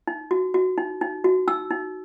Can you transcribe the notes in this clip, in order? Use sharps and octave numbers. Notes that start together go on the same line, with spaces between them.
D#4
F#4
F#4
D#4
D#4
F#4
D#4 E6
D#4